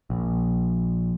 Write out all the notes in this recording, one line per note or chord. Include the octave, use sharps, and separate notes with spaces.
A#1